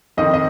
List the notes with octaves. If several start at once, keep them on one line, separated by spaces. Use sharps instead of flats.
F2 D#3 C4 D#5
D#5